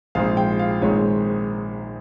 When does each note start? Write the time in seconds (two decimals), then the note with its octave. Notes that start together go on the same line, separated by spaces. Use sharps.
0.15 A#1 G#2 F3 G#3 C4 F5
0.37 G5
0.59 F5
0.82 A#1 G#2 D#3 G#3 C4 C#5